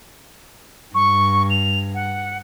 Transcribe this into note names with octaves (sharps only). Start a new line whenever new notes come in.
G2 C#6
F7
F#5